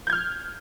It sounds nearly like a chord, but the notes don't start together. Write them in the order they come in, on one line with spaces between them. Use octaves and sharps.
G6 G#6 F6